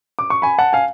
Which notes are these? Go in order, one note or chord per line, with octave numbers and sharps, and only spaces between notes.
D6
C#6
G#5 B5
F#5 A5
F5 G#5